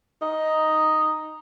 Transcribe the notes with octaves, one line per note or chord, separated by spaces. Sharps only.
D#4